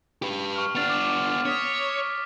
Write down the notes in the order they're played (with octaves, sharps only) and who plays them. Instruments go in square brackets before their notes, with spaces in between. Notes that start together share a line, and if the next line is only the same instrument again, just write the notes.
[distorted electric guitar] G4 B4
[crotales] C#6 F6
[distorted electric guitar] B3 D4 [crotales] F6 A6 F7
[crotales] D6
[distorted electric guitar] C#5 [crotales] D#6 B6 G7